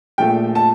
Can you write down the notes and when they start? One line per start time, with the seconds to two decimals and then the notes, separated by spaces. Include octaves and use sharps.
0.18 A#1 A#2 F3 A3 G5
0.55 A5